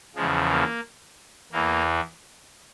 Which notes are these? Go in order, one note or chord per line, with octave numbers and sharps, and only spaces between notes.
E2 C#3 F3 G#3
A#3
E2 E3 A#3